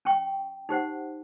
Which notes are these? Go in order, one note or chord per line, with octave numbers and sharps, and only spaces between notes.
C#4 G5 C#6
D#4 G4 C5 F#5